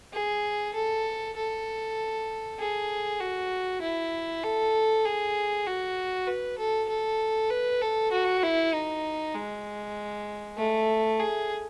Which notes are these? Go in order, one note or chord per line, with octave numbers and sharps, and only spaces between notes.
G#4
A4
A4
G#4
F#4
E4
A4
G#4
F#4
B4
A4
A4
B4
A4
F#4
E4
D#4
G#3
A3
G#4